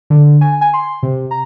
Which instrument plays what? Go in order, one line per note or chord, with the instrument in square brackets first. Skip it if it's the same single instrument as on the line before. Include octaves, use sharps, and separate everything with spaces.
[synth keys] D3
G#5
G#5
C6
C3
A#5